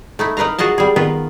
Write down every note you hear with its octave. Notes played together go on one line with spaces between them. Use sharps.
A3 D#4 E4
D#4 A#4 B4 F5 A#5
F4 F#4 G#4 D#5 A5
G3 G#4
D#3 B3 F4 A#4 B4